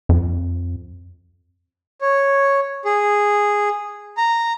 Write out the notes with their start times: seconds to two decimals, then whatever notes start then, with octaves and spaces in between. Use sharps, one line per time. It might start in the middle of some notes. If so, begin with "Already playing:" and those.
0.09 F2
2.01 C#5
2.85 G#4
4.17 A#5